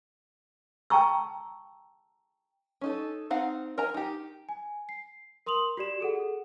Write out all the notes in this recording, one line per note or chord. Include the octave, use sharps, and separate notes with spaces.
G5 A5 A#5 C#6 E6
C#4 D#4 A4
C4 D#4 F5 F#5
A#4 D#5 G#5 A#5
D#4 G4
G#5
C7
A#4 C6 D#6 F7 F#7
F#4 G4 D5 E7
G#4 A4 F#5